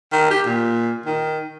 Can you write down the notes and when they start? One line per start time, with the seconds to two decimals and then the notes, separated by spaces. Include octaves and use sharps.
0.13 D#3
0.31 G4
0.46 A#2
1.06 D#3